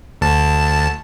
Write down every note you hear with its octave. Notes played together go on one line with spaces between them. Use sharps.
D2 A5